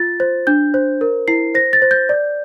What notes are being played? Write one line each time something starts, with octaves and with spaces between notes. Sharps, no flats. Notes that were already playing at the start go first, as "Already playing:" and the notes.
Already playing: F4 A6
C5
D4 G6
C5
A#4
E4 C7
C5 A#6
A6
C5
G6
D5